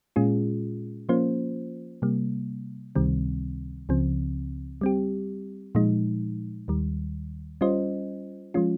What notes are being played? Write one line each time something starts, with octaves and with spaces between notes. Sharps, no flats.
A#2 G#3 C#4 F4 G#4
F3 A#3 C#4 F4 C5
C3 G3 A#3
C#2 C3 D#3 G3 C4
C#2 C#3 F3 C4
G3 C4 G4
A#2 F3 G#3 D#4
D#2 D#3 G3
G3 C#4 F4 C5 D#5
F3 G#3 C#4 F4